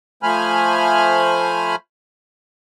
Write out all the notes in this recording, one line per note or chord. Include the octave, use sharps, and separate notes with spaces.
F3 A3 C5 G#5 B5 F6